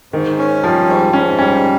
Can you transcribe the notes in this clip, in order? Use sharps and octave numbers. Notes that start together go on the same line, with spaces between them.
G#2 D#3
C#4
F3 G3
G#2
G#2 C#4
G3 C#4